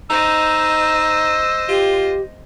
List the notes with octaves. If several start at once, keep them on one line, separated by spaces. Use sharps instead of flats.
D#4 C5 D#5 E6
F4 G4